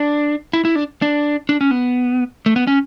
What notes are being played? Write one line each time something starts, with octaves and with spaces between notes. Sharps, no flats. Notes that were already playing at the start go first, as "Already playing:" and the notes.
Already playing: D4
E4
E4
D4
D4
D4
C#4
B3
A3
B3
C#4